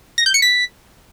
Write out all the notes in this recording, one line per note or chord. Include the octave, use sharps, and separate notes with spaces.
A#6
G6
C#7
B6